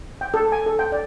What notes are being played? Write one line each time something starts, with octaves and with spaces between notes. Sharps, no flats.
G5
A4
G#5
A4
G5
D5